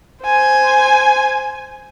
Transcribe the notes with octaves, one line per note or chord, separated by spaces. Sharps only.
C5 G#5